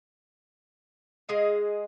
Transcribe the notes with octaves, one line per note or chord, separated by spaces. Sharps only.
G#3 G#4 D#5 F5